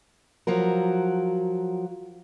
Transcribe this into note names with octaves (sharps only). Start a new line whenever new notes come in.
F3 F#3 F#4 A#4